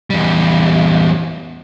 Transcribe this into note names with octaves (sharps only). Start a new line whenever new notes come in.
E2 G3